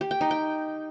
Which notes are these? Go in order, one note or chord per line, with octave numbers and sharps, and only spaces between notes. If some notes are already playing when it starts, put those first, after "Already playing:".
G4
G5
D#4
G5